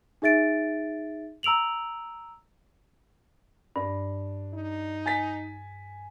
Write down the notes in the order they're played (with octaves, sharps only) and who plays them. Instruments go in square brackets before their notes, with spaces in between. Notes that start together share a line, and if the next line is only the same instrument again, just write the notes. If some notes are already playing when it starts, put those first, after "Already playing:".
[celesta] D#4 G#4 E5 A6 D7
A#5 E6 D7 F7 F#7
[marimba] G2 [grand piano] D4
[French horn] D#4
[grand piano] G#5 A6 B6